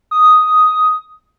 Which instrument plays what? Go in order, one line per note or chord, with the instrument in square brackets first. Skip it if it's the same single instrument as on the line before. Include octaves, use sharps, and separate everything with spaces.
[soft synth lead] D#6